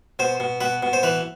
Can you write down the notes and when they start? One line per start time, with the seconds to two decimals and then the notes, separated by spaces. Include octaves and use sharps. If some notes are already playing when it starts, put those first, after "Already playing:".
0.19 B2 C5
0.40 B2
0.61 B2 B4
0.83 B2
0.93 C5
1.03 E3 B4